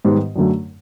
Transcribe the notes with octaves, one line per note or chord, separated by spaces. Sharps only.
G#2 D#3 G3 B3
F#2 D3 F#3 A3